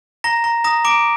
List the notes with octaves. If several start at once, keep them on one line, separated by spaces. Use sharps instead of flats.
A#5 A#6
A#5
A#5 D#6 A#6
A#5 D6 D7